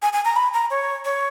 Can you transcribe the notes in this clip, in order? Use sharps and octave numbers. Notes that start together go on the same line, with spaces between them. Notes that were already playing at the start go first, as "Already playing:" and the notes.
G#5
G#5
A#5
B5
A#5
C#5
C#5